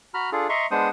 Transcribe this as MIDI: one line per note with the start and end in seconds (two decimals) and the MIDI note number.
0.14 0.30 66
0.14 0.30 82
0.14 0.30 83
0.14 0.30 89
0.32 0.47 62
0.32 0.47 65
0.32 0.47 68
0.32 0.47 69
0.49 0.66 75
0.49 0.66 76
0.49 0.66 82
0.49 0.66 84
0.49 0.66 85
0.71 0.89 56
0.71 0.89 59
0.71 0.89 62
0.71 0.89 72
0.71 0.89 78
0.71 0.89 87